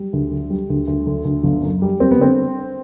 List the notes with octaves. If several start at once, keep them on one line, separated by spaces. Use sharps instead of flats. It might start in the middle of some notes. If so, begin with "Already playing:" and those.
Already playing: G3
D2
D3
G3
D2
D2
D3
D2
G1
F#2
G3
G3 C4
B3
D3 C4